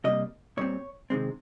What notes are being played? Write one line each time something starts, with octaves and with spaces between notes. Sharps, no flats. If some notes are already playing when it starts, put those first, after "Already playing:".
C3 G3 A#3 D#5
A#2 G3 C4 C#5
C3 D#3 G#3 C4